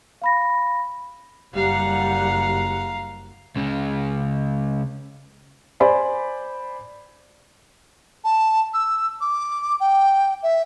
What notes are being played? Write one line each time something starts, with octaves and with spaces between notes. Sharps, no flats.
F5 B5 A#6
F#1 G3 F5 F#5 A#5
C#2 C#3
C5 D5 G#5 B5 C6
A5
E6
D6
G5
E5